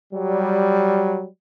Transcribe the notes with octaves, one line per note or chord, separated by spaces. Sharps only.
F#3 G3